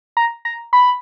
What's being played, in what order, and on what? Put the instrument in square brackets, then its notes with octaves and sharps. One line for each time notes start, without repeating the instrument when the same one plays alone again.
[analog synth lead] A#5
A#5
B5